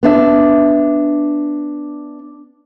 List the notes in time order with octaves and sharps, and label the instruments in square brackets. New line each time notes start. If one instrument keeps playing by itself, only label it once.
[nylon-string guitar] B3 D4 E5